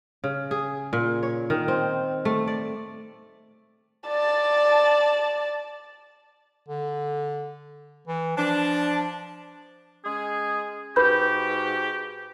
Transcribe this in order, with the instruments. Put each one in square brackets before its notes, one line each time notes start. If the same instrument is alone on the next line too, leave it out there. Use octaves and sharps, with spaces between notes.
[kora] C#3
G#4
A#2
C#5
D#3
C4
A3
D5
[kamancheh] D5 A5
[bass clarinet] D3
E3
[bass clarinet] F3 [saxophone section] D4
[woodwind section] G#3 C#4 G#4
[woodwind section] G#2 F#4 G4 [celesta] B4 B5 G6